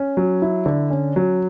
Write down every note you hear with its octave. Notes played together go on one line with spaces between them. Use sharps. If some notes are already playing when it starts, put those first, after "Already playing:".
Already playing: C#4
F#3
E4
D3
C#4
F#3